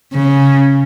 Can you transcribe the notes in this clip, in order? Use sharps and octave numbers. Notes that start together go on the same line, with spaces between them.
C#3